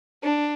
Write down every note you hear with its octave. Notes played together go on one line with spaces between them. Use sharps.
D4